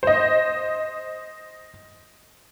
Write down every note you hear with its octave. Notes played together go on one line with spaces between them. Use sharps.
C5 D#5